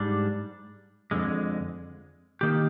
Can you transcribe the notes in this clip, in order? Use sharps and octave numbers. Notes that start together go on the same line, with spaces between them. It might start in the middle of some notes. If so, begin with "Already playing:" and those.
Already playing: G#2 G3 D4
F2 D3 G#3
D#3 A#3 D#4 G4